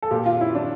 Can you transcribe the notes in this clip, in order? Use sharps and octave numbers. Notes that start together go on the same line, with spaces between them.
A4
A#2 G4
F4
E4
D4